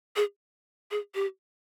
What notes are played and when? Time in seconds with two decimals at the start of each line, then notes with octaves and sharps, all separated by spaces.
0.16 G#4
0.91 G#4
1.15 G4